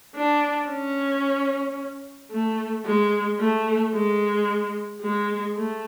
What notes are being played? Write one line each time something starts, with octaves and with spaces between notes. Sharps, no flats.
D4
C#4
A3
G#3
A3
G#3
G#3
A3